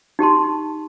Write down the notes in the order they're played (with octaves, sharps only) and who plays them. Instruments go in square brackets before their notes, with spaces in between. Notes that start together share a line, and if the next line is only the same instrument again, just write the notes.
[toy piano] D#4 G4 A5 C6